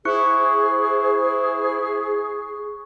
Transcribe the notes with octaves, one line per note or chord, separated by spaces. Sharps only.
E4 G#4 C5 C#6 F#6 C#7